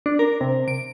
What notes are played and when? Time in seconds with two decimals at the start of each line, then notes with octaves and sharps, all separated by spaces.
0.06 D4
0.19 A#4
0.41 C3
0.68 D7